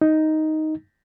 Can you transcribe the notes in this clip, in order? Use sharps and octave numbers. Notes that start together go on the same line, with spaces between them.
D#4